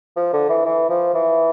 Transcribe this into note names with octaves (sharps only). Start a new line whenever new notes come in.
F3
D3
E3
E3
F3
E3